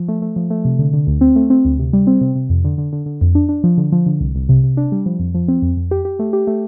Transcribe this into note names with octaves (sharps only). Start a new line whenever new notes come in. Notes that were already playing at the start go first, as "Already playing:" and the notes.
Already playing: F3
A3
A3
F3
A3
C3
D3
D3
D2
C4
A3
C4
D2
C3
G3
C4
C3
C3
F2
D3
D3
D3
D3
F2
D4
D4
F3
D3
F3
D3
C2
C2
C3
C3
D4
G3
F3
F2
F3
C4
F2
F2
G4
G4
A3
G4
A3